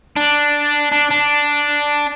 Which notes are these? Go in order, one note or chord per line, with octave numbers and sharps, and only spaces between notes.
D4
D4
D4